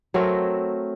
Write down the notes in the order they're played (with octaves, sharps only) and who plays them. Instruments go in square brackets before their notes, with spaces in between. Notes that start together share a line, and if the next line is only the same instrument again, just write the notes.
[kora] F#3 A3 C4 A#4